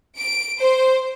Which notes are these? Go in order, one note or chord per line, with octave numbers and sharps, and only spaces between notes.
D7
C5